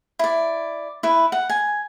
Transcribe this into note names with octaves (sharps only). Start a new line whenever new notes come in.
E4 D5
E4 B4
F#5
G#5